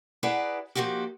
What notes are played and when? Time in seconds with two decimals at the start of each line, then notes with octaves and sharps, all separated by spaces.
0.23 E4 G#4 B4 D5 F#5 A#5
0.75 F3 A#3 D#4 F#4 G4